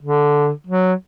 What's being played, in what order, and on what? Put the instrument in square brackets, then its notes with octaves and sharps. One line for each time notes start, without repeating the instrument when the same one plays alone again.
[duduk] D3
F#3